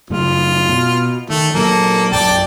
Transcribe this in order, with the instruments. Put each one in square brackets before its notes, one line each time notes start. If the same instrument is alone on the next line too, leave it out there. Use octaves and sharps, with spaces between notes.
[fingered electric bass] F#2 C#3 A3 [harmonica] F4
[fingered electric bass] B2
[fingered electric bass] D#3 [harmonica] A3
[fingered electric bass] A#2 F#3 [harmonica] A#3 A4
[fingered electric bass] A#1 F#2 [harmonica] D5 G5 A5